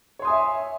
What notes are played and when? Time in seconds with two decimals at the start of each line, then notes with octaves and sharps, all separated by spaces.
0.19 C#5
0.22 C6
0.25 D#6
0.27 G#5
0.30 E5